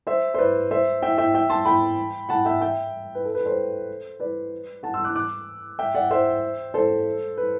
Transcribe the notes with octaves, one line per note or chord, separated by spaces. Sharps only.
C5 E5
C5
B4 D5
C5 E5
E5 G5
E5 G5
E5 G5
A5 C6
G5 B5
F#5 A5
E5 G5
E5 G5
B4
A4
B4
A4 C5
B4 D5
F#5 A5
C6 E6
D6 F#6
D6 F#6
E5 G5
D5 F#5
C5 E5
A4 C5
B4